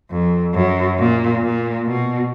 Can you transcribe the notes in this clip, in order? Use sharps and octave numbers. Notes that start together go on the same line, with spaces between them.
F2
F#2
A#2
A#2
B2